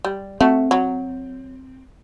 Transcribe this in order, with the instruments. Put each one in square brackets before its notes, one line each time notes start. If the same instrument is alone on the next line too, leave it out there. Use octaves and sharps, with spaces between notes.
[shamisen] G3
[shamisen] A3 F#4 [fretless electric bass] C4
[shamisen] F#3